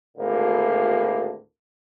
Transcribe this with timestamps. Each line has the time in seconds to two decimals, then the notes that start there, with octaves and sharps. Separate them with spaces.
0.17 G#1 D2 A2 D3 A#3